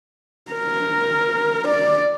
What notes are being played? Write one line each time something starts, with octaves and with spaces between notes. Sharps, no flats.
A#4
D5